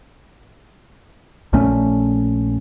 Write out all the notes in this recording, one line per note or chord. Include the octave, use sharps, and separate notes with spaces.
A#1 A#2 A3 C#4